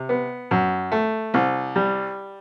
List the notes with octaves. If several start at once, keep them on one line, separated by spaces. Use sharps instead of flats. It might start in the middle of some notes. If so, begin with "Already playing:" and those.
Already playing: C3
B3
F#2
A3
C2
G3